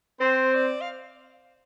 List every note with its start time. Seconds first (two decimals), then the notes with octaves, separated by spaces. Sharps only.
0.20 C4 C5
0.55 D5
0.81 F5